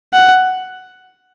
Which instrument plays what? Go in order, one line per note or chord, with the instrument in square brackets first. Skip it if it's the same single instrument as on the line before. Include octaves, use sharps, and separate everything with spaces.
[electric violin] F#5